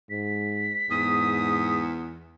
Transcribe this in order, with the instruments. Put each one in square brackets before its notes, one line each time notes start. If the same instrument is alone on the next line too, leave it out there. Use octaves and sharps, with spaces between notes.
[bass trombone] G#2 [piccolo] B6
[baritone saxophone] E2 [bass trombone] G#2 [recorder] D#6